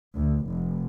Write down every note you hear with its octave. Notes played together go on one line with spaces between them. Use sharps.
D2
F1